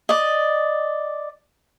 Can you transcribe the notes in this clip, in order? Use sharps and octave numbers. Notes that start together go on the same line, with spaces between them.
D5 D#5